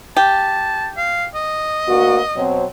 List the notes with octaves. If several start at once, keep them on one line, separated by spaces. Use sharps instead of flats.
G4 A5
F5
D#5
D2 A#3 F#4
B2 F#3 C4